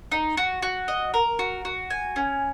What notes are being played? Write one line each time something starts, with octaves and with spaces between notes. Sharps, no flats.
D#4
F#4
F#4
D#5
A#4
F#4
F#4
G#5
C#4